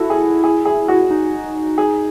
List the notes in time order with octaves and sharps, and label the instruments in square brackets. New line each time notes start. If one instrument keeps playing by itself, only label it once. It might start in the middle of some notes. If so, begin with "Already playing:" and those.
Already playing: [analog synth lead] E4 [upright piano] F#4 A4
[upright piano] G#4
G#4
G#4
F#4
[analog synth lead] D#4
[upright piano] G#4